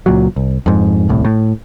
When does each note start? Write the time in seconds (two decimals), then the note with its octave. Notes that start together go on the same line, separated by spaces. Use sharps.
0.06 C#2 A#2 F#3
0.36 C2
0.66 F2 G#2
1.09 D#1 C2 A2
1.24 A2